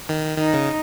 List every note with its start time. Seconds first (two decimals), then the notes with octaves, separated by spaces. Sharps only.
0.09 D#3
0.38 D#3 D#4
0.53 C#3